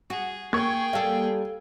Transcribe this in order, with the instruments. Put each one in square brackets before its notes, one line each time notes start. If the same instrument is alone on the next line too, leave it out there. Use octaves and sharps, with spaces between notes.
[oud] F#4 [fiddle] G#4
[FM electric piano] A#3 [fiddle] G#4 G5 [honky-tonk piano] C#6 G#6
[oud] G3 A4 [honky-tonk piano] F5